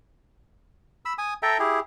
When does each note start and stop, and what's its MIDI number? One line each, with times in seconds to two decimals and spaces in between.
1.05 1.13 83
1.05 1.13 88
1.18 1.34 80
1.18 1.34 87
1.43 1.58 69
1.43 1.58 76
1.43 1.58 79
1.43 1.58 82
1.59 1.80 64
1.59 1.80 67
1.59 1.80 68